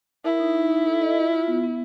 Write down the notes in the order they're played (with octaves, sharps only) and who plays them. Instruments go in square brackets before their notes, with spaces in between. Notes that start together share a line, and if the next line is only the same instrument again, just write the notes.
[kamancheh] E4 [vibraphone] A#4
[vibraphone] D#4
D#4
D#4
A4
D#5
F4
F4
B3
B3